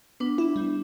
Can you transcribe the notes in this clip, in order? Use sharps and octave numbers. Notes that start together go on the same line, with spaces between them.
B3 D4
E4
G3